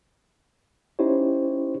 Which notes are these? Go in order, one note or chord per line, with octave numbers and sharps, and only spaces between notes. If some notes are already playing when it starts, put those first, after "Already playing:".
C#4 D#4 E4 G4 C5 C#5